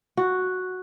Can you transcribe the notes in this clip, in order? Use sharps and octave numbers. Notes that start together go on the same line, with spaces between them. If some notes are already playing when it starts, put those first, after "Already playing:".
F#4